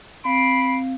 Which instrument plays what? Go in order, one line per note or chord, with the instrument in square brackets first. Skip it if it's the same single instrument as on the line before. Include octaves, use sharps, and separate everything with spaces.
[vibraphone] C4 F5 [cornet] B5 [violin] C7 D7